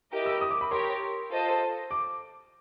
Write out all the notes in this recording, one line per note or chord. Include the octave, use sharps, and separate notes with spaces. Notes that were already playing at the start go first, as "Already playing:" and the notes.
E4 G4 A#4 D#5
E6
D#6
D6
B5
G4 A#4 C#5 C6
F4 A4 C5 D#5
D6